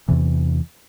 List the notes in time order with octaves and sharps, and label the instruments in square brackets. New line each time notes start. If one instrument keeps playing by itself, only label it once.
[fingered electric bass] E2 C3 E3